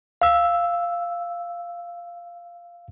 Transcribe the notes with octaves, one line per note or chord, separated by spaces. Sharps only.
F5 E6